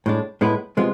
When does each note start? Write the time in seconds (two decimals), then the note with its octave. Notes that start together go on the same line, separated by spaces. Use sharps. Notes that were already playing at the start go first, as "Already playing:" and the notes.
0.06 A2 G#3 D4
0.41 A2 G#3 B3 E4 B4
0.77 C3 G#3 B3 F4